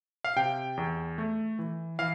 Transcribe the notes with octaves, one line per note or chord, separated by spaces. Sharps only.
F5
C3 G5
E2
A3
E3
E3 F5